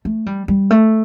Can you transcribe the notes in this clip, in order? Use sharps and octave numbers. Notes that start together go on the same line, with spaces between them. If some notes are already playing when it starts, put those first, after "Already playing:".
A3
G3
G3
A3